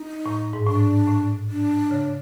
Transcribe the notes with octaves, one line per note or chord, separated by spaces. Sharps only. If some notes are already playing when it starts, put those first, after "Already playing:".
Already playing: D#4
A2
G#2
A2 D4
A2
D4
C#3